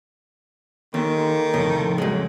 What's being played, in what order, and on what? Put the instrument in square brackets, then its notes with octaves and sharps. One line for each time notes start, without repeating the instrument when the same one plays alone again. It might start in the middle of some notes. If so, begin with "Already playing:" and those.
[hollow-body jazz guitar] D#2 [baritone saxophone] D#3 [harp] A4 G#5 C6
[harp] F2 C#3 F3 [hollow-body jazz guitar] A2
[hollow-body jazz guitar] F#2 G#3